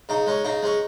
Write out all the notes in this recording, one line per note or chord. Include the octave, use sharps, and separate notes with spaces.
C#3 D#4
G#3 C#4
C#3 D#4
G#3 C#4